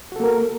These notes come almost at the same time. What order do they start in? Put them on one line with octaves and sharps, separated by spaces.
F#4 A4 A#3 A#4